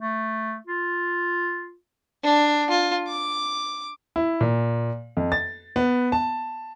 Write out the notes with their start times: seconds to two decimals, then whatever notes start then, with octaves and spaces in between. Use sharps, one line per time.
0.01 A3
0.67 F4
2.24 D4
2.70 F4
3.08 D6
4.16 E4
4.41 A#2
5.17 F2
5.32 A6
5.76 B3
6.12 A5